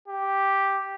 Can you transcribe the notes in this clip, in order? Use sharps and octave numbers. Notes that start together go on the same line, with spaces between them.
G4